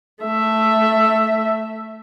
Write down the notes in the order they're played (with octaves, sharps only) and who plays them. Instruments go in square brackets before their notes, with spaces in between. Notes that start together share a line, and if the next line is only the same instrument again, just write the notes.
[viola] A3 E5